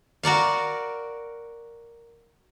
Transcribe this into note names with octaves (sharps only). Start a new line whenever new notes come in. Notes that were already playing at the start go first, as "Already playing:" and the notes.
F#4 A#4 D5 F5